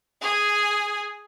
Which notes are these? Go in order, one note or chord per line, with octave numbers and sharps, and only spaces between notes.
G#4